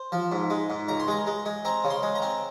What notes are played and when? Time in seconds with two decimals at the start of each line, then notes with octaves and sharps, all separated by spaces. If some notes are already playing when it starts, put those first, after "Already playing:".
Already playing: C5
0.12 F3
0.32 G#2
0.50 G#3
0.70 G#2
0.88 C#2 A#5
1.00 C6
1.08 G#3 A#5
1.27 G#3
1.46 G#3
1.65 C4 A#5
1.84 C#3
1.90 C6
2.03 G#3
2.15 A#5
2.22 C4